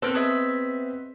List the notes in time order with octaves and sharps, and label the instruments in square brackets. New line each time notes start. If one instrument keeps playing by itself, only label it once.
[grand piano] B3 C4 [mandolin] A4 A#4 F#6
[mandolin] G#4 D#5 E5